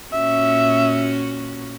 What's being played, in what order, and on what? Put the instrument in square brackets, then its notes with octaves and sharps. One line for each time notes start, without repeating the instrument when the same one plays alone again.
[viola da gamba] A#2 C#4 F#4 [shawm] E5